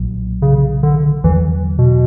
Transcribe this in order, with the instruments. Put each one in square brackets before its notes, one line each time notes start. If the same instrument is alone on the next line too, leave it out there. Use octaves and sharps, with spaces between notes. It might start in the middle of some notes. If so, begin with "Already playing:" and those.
Already playing: [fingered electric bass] B1 A#2 F#3
[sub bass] C#3
D3
[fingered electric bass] E2 D3 F#3 [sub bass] E3
[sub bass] B2